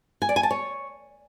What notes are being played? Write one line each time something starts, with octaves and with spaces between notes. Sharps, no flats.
G#5
D5
G#5
A5
C#5